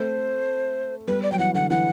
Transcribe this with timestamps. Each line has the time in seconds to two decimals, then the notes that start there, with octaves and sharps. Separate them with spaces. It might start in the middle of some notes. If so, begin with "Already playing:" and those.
Already playing: A3 C4 C5
1.08 G3 B3 B4
1.23 D5
1.32 F#3 G5
1.39 E3 F#5
1.54 D3 F#5
1.70 E3 F#5